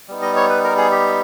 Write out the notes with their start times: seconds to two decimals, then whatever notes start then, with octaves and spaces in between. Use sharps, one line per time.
0.08 G3 B3 D#4
0.22 D#5
0.36 C#5
0.49 B4
0.64 A#4
0.77 G#4
0.92 G4